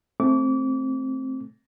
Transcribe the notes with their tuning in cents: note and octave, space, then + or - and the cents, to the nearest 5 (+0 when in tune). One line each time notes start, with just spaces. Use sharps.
A3 -5 C4 +10 D6 -30